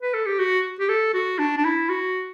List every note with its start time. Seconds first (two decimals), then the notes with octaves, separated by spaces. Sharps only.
0.02 B4
0.14 A4
0.26 G4
0.39 F#4
0.80 G4
0.89 A4
1.14 F#4
1.39 D4
1.57 D4
1.65 E4
1.89 F#4